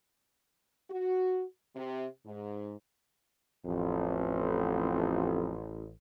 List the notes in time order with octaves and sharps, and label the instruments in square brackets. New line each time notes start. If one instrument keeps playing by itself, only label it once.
[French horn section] F#4
C3
G#2
[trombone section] A1 [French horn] F2